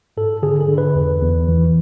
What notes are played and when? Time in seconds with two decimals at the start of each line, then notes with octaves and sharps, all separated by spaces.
0.17 G#2 A4
0.43 D3 G#4
0.60 A4
0.69 D3
0.78 B4
0.95 E2
1.21 E2
1.48 E3